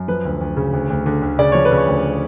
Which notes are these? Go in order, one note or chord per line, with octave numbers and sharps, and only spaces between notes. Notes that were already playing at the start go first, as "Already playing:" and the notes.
Already playing: F#2
F3 B4
D2
D2
C#3
D2
D2
D3
D2
C#3 D5
F3 C#5
B4
C#3
C#5
D2